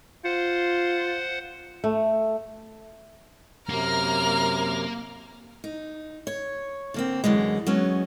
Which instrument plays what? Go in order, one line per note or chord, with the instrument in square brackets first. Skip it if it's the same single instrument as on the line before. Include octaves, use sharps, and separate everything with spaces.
[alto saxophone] F4 [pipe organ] C5 F#5
[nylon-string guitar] A3
[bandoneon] F#2 C3 [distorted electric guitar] A#3 [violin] A#5 F6
[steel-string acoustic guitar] D#4
C#5
D3 A#3 C4
F#2 D3 E3 G#3
F#3 G#3 B3 C#4